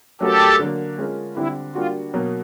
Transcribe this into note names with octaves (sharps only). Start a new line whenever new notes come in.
F#3 A3 C#4 F#4 G4 A4 A#4
D3 F#3 A#3
G#3 C#4 F4 A#4
D3 G3 C4 E4
G3 A#3 D4 F4 F#4
B2 F#3 A#3